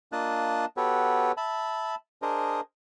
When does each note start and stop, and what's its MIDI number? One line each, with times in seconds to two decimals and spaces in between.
0.12 0.65 58
0.12 0.65 62
0.12 0.65 65
0.12 0.65 75
0.12 0.65 81
0.12 0.65 90
0.77 1.32 59
0.77 1.32 66
0.77 1.32 67
0.77 1.32 69
0.77 1.32 71
0.77 1.32 73
1.37 1.95 76
1.37 1.95 81
1.37 1.95 83
2.22 2.61 62
2.22 2.61 68
2.22 2.61 70
2.22 2.61 72
2.22 2.61 75